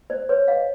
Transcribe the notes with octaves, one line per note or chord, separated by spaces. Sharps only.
C5 D5
B4 C#5
D#5 F5